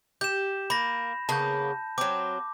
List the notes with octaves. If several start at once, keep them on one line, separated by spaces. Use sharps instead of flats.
G4 G6 E7
A#3 B5 A#6
C#3 A#3 B3 A5 G6
F#3 C4 D6